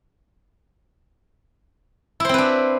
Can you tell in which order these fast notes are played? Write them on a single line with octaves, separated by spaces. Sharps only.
E4 C5 C4 B4 D4